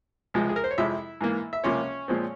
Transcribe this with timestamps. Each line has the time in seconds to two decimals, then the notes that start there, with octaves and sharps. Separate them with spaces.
0.34 C#2 C3 F3 G#3
0.49 G#4
0.56 A#4
0.64 C5
0.71 C#5
0.78 F2 C3 F3 G#3 E4 E5
1.21 G#2 E3 A#3
1.53 E5
1.64 C#2 C3 F3 A#3 C#4 C#5
2.08 A#2 F3 G#3 C4